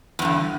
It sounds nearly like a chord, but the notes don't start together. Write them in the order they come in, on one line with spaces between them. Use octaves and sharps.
E2 G2 D3